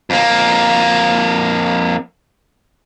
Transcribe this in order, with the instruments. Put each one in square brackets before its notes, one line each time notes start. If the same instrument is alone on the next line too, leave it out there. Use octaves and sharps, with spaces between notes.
[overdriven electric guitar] F2 A#3